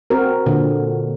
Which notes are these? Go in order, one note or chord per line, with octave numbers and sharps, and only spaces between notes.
C4 F#4 A#4
A#2 D3